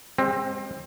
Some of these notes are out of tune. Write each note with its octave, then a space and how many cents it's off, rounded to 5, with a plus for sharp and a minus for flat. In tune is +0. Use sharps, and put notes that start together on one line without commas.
G#3 -20 C4 +20 G4 +20